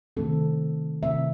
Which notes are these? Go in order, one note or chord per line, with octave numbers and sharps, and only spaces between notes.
C3 D#3 A3 C4 A4
C3 D#3 A3 C4 E5